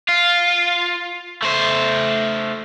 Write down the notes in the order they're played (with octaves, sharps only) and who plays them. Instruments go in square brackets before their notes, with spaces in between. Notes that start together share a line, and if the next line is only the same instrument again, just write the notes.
[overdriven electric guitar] F4
A3 C5